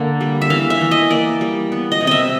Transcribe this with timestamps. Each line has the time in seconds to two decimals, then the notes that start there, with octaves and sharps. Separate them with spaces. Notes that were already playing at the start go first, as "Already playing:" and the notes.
Already playing: D3 A#3
0.21 G3
0.42 E5
0.50 E3 F5
0.70 E5
0.81 E3
0.91 D#5
1.11 A#3 D5
1.41 G3
1.72 B3
1.92 D#5
2.01 C3
2.07 D#5 E5